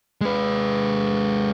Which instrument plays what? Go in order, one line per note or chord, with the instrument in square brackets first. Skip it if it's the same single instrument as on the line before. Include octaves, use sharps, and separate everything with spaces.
[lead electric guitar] G#3 B4